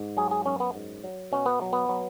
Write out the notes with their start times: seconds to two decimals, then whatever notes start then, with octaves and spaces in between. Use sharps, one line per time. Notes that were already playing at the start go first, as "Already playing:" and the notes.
Already playing: G#2
0.17 F#3 G#4
0.31 G#4
0.46 F#2 C#4
0.60 B3
0.75 G#2
1.04 F#3
1.32 B2 C#4
1.46 B3
1.62 F#3
1.73 B3
1.89 F#3